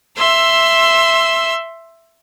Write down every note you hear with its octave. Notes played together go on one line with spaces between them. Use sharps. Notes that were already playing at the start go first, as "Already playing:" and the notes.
E5 C6 E6